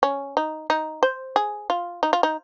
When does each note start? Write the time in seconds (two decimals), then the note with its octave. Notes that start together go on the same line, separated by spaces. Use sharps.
0.03 C#4
0.37 D#4
0.70 D#4
1.03 C5
1.36 G#4
1.70 F4
2.03 D#4
2.13 F4
2.23 D#4